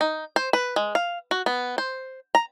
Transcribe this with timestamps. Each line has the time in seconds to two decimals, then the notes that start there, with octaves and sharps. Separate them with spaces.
0.01 D#4
0.36 C5
0.53 B4
0.76 G#3
0.95 F5
1.31 F#4
1.46 B3
1.78 C5
2.35 A#5